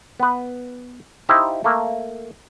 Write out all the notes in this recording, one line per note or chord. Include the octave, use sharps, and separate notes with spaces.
B3 B4
D#4 E4 G4 C5 E5 F5
A3 A#3